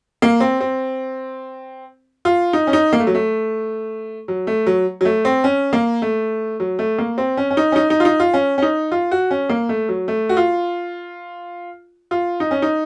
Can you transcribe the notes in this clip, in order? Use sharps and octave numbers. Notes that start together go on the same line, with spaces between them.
A#3
C4
C4
F4
D#4
C#4
D#4
A#3
A3
F#3
A3
F#3
A3
F#3
F#3
A3
C4
C#4
A#3
A3
F#3
A3
A#3
C4
C#4
C#4
D#4
C#4
D#4
D#4
F4
D#4
F4
C#4
C#4
D#4
F4
F#4
C#4
A#3
A3
F#3
A3
F#4
F4
F4
D#4
C#4
D#4